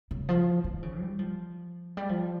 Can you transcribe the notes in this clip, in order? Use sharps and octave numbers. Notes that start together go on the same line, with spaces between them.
C#3
F3
D#3
C#3
G3
F3
G3
F3